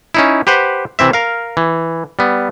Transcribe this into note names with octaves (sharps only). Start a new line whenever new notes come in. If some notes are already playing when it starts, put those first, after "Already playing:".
C#4 D#4 E4
G4 B4 C5 F#5
C3 E3 C4 E5
A#4 F5
E3
G3 B3